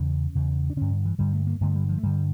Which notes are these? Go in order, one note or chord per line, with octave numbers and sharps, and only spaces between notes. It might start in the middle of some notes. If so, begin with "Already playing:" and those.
Already playing: E2 C#3 C#4
E2 C#3
D4
G2 D3 C#4
D3
E3
G2 D3 G3
A3
A#3
G2 D3 A3
G3
F3
A3
G2 D3 G3